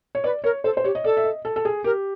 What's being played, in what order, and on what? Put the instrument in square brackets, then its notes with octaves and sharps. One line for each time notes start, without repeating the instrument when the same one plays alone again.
[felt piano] C#5
[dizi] B4 [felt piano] D5
[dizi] A#4 [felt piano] C#5
[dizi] A4 [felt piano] C5
[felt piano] C5
[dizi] G4 [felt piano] C#5
[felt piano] D#5
[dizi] A4 [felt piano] D5
[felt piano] E5
D#5
A4
A4
G#4
[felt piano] G4 [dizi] A#4